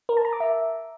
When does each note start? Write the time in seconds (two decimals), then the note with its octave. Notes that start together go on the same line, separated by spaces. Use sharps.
0.09 A#4
0.17 A5
0.25 A#5
0.33 D6
0.40 E5